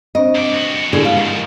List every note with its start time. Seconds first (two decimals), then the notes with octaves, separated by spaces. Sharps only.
0.15 C4 D4 C5 D#5
0.35 C3 D5
0.51 G2 F#4
0.93 B2 D3 G#3 E4 G4 G#4 D5
1.05 F5
1.18 G#2 F3 A#4